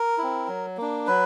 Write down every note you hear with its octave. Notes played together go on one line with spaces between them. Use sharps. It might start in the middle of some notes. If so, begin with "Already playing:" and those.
Already playing: A#4
C4 E4
F#3
A#3 D4
F#3 B4